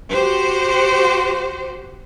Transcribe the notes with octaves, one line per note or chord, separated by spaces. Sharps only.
F#4 G4 C5